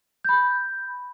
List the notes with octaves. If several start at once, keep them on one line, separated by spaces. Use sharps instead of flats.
B5 G6